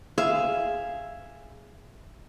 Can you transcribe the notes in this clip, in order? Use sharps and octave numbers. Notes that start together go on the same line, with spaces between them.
G#4 E5 F5